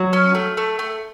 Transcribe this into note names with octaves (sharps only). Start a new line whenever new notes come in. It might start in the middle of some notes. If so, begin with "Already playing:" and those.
Already playing: F#3
C#4
A3
A3
A3